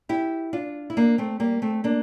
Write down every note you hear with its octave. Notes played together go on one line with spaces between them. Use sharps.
E4 G4
D4 F4
E4
A#3 D4
A3 C4
G3 A#3
A3 C4
A#3 D4